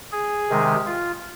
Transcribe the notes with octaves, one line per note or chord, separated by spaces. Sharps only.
G#4
C3 D#3 G#3
F4